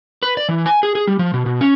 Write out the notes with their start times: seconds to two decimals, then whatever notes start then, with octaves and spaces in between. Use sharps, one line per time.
0.23 B4
0.37 D5
0.49 E3
0.66 G#5
0.83 G#4
0.95 G#4
1.07 G3
1.19 F3
1.34 B2
1.46 B2
1.61 C#4